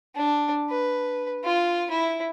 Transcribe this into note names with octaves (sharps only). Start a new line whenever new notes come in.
D4
B4
F4
E4